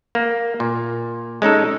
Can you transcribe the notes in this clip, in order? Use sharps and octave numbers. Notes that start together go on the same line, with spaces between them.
A#3
A#2
G#3 C#4 D#4 A4